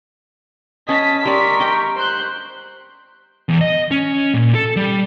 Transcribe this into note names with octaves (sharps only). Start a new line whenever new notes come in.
C#4 D#5 A5 D#6 B6
G3 A#4 D5 C6 C#6
D#5 G5
C5 C6 F#6 G6
E2
D#5
C#4
A#2
A4
G3